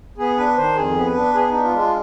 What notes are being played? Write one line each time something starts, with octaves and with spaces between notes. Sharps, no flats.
B3 G#4
D4 B4
D#3 C5
F2 G#4
B3
B4
D4
B3 G#4
D4 D#4
F4
G#3
F4